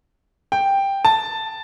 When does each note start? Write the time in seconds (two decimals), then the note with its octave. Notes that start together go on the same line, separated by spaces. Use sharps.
0.52 G5
1.05 A5